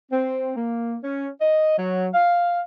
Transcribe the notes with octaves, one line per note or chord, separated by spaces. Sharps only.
C4
A#3
C#4
D#5
F#3
F5